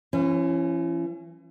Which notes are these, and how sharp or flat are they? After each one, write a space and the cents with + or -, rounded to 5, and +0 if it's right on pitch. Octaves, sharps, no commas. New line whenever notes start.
E3 +40 C#4 -20